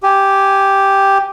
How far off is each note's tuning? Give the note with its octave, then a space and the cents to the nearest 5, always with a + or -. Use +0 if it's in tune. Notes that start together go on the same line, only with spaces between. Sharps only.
G4 +0 G#5 +0